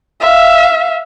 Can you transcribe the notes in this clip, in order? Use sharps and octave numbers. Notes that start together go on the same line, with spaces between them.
E5 F5